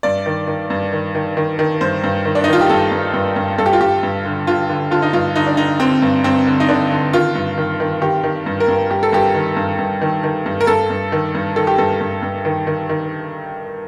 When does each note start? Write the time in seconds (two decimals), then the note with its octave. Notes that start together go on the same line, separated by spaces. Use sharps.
0.03 G2 D5
0.26 D#3
0.47 D#3
0.70 G2
0.93 D#3
1.15 D#3
1.37 D#3
1.59 D#3
1.81 G2 C5
2.04 G2
2.25 D#3
2.35 D4
2.44 D#4
2.48 D#3 F4
2.61 G4
2.70 G2 A4
2.92 G2
3.14 G2
3.36 G2
3.58 G2 A4
3.66 G4
3.73 F4
3.81 G2 G4
4.03 G2
4.26 D3
4.47 D3 F4
4.69 D3
4.91 D3 F4
5.02 D#4
5.13 G2 F4
5.36 D3 D#4
5.47 D4
5.57 D3 D#4
5.80 D3 C4
6.02 G2
6.24 G2 C4
6.47 D3
6.60 D#4
6.69 D3 D4
6.91 D3
7.13 D#3 F4
7.35 G2
7.58 D#3
7.80 D#3
8.02 D#3 G4
8.24 D#3
8.46 G2
8.60 A#4
8.68 G2
8.91 G2 G4
9.03 A4
9.13 G2 G4
9.35 D#3
9.57 G2
9.79 G2
10.02 D#3
10.24 D#3
10.46 G2
10.61 A#4
10.67 G2 A4
10.90 G2
11.12 D#3
11.35 G2
11.56 D#3 A4
11.67 G4
11.78 G2 A4
12.01 G2
12.22 G2
12.45 D#3
12.67 D#3
12.89 D#3